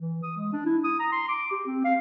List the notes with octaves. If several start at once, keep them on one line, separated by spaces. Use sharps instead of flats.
E3
D#6
G#3
D4
E4
D#6
A#5
C6
D6
G4
C4
F5